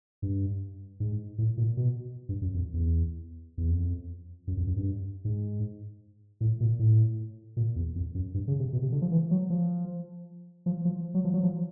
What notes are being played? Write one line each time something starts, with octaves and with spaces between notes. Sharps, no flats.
G2
G#2
A2
A#2
B2
G2
F#2
F2
E2
E2
F2
F#2
F2
F#2
G2
G#2
A2
A#2
A2
A#2
E2
F2
F#2
G2
C#3
C3
B2
C3
D3
F3
E3
F#3
F3
F3
F3
F#3
F3
F#3
F3